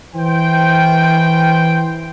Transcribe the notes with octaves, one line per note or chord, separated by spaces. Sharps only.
E3 C5 G5